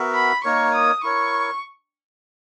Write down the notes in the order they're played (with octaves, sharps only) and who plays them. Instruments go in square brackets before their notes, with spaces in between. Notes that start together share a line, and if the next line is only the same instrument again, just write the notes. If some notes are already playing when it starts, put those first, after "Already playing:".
Already playing: [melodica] B3 F#4 A#4 E5
[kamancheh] B5
[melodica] A#3 D#4 A#4 C#5 [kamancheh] C#6
[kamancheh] D#6
[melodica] E4 A#4 C#5 [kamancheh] C#6